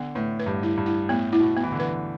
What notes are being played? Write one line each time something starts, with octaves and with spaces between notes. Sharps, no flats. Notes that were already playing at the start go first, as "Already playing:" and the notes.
Already playing: D3 B3
A2 B4
B4
G2
E4
G2
E4
A2 B3
E4
B2
B3
E3
D3
B4